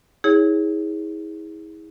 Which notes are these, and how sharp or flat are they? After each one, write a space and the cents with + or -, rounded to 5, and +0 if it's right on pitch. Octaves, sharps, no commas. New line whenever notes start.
E4 -40 G#4 -15 C#5 +0